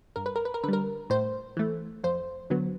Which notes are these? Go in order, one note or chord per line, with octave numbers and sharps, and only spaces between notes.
G2 A#4
B4
A#4
B4
A#4
D3 G3 A#4 B4
A2 C5
E3 A3
F2 C5
D3 F#3 B3